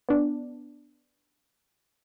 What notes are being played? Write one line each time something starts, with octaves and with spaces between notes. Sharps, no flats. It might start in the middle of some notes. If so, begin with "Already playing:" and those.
B3 D4